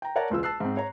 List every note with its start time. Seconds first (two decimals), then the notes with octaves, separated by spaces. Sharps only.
0.02 G5 A#5
0.15 A#4 C#5 D5 F#5 A5 A#5
0.30 E1 C#2 F4 E6
0.43 A5 E6 F#6 C7
0.60 G#2 C4
0.77 C#5 A#5